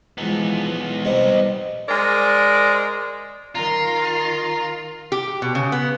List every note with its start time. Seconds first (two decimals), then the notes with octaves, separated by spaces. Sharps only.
0.18 E3 F3 G#3 B3 D#4
1.05 C3 G3 D#5
1.88 G#3 A#4 C5 D5
3.55 D#3 F4 A#4 A#5
5.12 G4
5.42 B2
5.55 C#3
5.72 B3